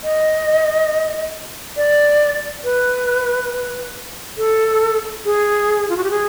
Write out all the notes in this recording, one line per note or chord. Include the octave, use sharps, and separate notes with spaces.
D#5
D5
B4
A4
G#4
F4
F#4
G4
G#4